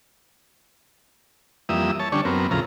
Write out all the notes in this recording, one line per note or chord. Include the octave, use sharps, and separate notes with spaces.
F2 E3 G3 A#3 E5 D#6
C#5 A5
D3 G3 C#4 D4 C#5
F#2 B3 C4 A#4
E2 A2 C#3 F3 A#5